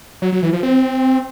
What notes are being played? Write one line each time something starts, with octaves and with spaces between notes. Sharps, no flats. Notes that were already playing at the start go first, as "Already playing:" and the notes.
F#3
F#3
E3
F3
C4